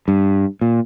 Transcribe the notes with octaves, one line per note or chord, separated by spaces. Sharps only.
G2
A#2